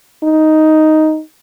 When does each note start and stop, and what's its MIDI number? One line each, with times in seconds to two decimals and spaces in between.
0.24 1.21 63